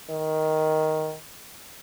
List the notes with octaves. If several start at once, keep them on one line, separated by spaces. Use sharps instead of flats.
D#3